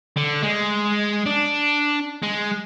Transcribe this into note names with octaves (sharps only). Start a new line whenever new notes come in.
D3
G#3
D4
G#3